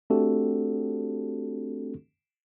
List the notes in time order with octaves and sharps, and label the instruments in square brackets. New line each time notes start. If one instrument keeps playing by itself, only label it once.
[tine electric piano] A3 C4 D4 F#4 G4 A4